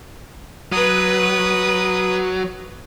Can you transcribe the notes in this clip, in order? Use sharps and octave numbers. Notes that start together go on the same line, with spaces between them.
F#3 B4 D#6